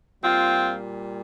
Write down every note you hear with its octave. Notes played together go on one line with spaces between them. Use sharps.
A#2 G3 C4 F4